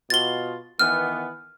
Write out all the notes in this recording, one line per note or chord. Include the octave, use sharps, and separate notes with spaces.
B2 F4 A6 G7
D#3 E3 B3 F6